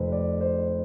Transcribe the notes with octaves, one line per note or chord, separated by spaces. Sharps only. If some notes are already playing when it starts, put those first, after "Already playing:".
Already playing: F1 F2 C3 B4 C5
D5
C5